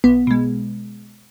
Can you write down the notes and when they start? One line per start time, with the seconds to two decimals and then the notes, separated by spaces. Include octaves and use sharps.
0.04 B1 B3
0.27 B2 G#3